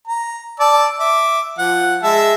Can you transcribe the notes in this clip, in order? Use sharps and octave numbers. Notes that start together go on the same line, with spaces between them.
A#5
D5 A5 E6
E5 D6
F3 F#5
G#3 E5 A5